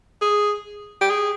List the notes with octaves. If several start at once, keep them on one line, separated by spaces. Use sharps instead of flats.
G#4
G4
G#4